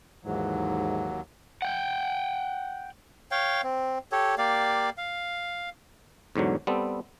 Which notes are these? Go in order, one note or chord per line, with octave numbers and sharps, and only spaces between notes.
D#2 G#2 E3 F#3
F#5 G5
C#5 F5 G5
C4
G4 A4 C#5
A#3 G4 D5 F5
F5
E2 G#2 D3 F#3
G3 B3 C4 A4